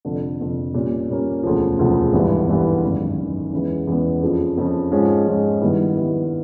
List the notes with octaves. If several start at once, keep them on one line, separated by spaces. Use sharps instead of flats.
F1 F2 D3
F1 F2 D3
A#2 G3 A#3 C#4
A#2 G3 A#3 C#4
E1 D2 C#3 F3
E1 D2 C#3 F3
G#1 G2 E3 G3 B3
G#1 G2 E3 G3 B3
G#1 F#2 D#3
G#1 F#2 D#3
E2 C#3 E3 G#3 B3
E2 C#3 E3 G#3 B3
F2 C#3 F3
F2 C#3 F3
G#2 F3 G#3 C#4
G#2 F3 G#3 C#4
G2 D#3 G3 B3 E4
G2 D#3 G3 B3 E4